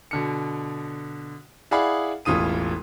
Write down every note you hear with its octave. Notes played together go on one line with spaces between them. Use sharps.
B2 D3 C#7
E4 G#4 D5 F5 F#5 B5
E1 A1 E3 F4 D#6 D#7